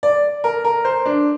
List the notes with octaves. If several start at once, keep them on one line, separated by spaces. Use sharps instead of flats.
D5
A#4
A#4
C5
D4